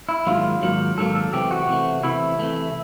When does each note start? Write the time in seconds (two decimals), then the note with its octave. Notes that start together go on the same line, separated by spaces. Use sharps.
0.09 E4
0.27 G#2 D#3 F#3 A#3 F4
0.62 G#2 D#3 F#3 A#3
0.97 G#2 D#3 F#3 A#3 A4
1.15 A4
1.33 C3 E3 A3 G4
1.51 F#4
1.69 C3 E3 A3
2.03 C3 E3 A3 E4
2.39 C3 E3 A3